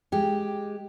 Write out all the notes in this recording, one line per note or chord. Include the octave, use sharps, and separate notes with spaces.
G#3 G4